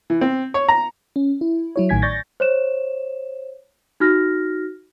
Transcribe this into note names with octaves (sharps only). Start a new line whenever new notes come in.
E3
C4
C#5
A#5
C#4
E4
F#3 E4 C#5
A1 A2 D#3 G#5 G#6 B6
D5 C#6 G6 A6 A#6
C5 C#5 E7
D#4 F#4 F6 A#6